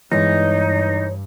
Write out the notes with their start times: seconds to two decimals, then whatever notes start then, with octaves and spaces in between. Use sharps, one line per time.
0.12 G2 E3 G#3 B3 D#4 C#5